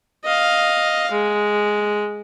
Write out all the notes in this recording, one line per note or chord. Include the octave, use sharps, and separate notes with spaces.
D#5 F5
G#3